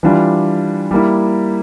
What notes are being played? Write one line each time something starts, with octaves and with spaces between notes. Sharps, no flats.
E3 G3 D4 F4
G3 A#3 E4